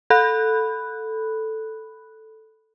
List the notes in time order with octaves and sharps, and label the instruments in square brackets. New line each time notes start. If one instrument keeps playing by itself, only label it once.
[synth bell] A4 B5 F#6